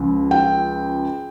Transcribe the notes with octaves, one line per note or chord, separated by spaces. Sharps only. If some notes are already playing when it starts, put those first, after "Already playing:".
Already playing: C#2 C#3 F3
G5